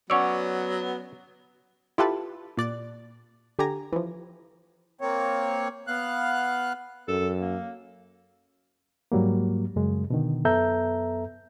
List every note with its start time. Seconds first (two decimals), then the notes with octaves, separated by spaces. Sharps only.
0.10 F#3 B3 C#4 C#5 D5 F#5 C#6 E6
1.98 E4 F4 G4 A4 B4 A5
2.57 A#2 D5 F#6 A6
3.59 D3 G4 G#5 A#5
3.93 E3 F3
5.01 A#3 C4 C#5
5.87 B3 F5 F#6
7.08 F#2 A4
7.39 A#3
9.12 G#2 F#3 G3 A#3
9.76 F#2 C#3 G#3
10.10 B2 D3 D#3
10.45 F#2 B3 A4 E5 A#5 G6